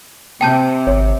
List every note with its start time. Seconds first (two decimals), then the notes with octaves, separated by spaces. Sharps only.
0.41 C3 G5 A5 G6
0.87 G#1 C#5